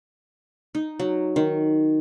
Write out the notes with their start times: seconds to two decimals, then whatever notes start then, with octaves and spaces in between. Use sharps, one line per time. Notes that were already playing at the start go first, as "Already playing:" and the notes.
0.75 D#4
0.99 F#3
1.36 D#3